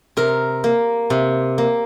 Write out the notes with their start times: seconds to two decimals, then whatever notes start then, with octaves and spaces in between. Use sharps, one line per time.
0.17 C3 A#4
0.64 A#3
1.10 C3
1.58 A#3